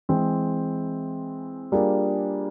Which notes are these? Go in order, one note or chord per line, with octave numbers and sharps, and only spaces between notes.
E3 G#3 C4
G3 A#3 D4 F4 G#4